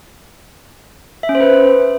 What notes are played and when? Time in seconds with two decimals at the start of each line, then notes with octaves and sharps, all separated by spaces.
1.23 E5
1.29 C#4
1.35 C5
1.41 B4